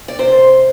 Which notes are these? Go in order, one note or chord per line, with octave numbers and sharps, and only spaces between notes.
D5
C3 C5